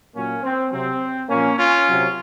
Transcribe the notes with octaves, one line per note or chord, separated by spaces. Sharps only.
A#2 F#3 A#3 C#4
C4
C3 F#3 C4
A#2 F3 A#3 C#4
C#4 F4
C3 F#3